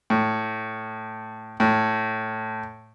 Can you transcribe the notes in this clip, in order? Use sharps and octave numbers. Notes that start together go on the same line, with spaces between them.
A2
A2